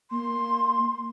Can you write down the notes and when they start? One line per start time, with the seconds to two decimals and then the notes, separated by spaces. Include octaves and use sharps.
0.11 A#3 C6